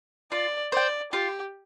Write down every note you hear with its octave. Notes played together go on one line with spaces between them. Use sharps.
F4 D5
C5 D5 G5
F4 G4